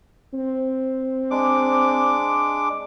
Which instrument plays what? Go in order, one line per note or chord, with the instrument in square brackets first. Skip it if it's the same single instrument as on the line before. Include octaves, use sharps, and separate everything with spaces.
[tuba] C4
[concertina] G#3 D4 D6